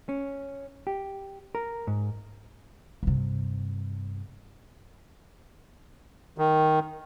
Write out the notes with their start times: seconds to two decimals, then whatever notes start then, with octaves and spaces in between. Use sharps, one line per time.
0.09 C#4
0.87 G4
1.55 A#4
1.87 G#2
3.03 G2 C3
6.38 D#3